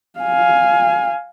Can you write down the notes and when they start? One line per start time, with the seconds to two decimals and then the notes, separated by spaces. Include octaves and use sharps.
0.20 F5 G#5